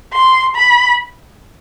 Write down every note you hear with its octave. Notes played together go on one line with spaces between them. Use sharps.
C6
B5